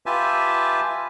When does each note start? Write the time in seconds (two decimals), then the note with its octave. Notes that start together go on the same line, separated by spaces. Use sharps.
0.06 F4 G4 B4 E5 G#5 A5